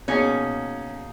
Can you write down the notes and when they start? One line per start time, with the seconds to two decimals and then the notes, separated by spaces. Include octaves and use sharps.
0.08 B2 A#3 C#4 D#4 G#4